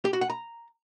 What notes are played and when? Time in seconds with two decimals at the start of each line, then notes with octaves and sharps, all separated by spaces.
0.05 G4
0.13 F#4
0.21 F#5
0.30 A#5